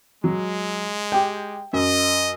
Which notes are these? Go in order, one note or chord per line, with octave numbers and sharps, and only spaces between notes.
F#3 G#3
G4 G5
F#2 D#5